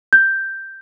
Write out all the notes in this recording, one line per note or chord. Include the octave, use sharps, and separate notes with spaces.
G6